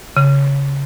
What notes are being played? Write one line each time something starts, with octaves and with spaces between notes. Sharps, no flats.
C#3